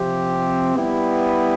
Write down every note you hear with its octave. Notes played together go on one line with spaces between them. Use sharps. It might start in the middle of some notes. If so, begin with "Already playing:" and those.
Already playing: C3 F3 C4 G4
G3 B3 E4 G4